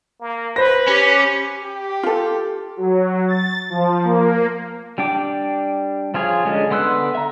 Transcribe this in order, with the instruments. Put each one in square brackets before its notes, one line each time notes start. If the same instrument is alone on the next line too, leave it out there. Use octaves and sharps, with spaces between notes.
[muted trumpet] A#3
[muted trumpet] B4 [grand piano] C5 A#6
[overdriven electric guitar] C#4 [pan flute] G4
[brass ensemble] G4
[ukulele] F4 A4
[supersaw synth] F#3
A6
F3
A#3
[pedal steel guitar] G3 D4 G5 D6
F3 F4 G#4 C#5
D3 G3 G#3 C#4
D3 B3 C6 E6 F#6
E5 A#5